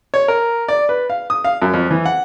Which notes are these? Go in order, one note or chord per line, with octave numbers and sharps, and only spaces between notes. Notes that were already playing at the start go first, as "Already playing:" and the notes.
C#5
A#4
D5
B4
F5
D#6
F5
F#2
F2
E3
F#5